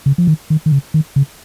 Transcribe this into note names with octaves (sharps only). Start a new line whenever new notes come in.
C#3
F3
D#3
D#3
D#3
C#3
D#3
C#3